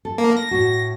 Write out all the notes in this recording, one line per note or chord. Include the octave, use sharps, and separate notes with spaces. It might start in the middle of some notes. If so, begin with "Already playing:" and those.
A4
A#3
A#6
A2 F#4